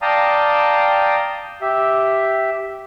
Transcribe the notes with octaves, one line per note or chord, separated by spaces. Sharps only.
D5 F5 G5 A5 A#5 D#6
G4 E5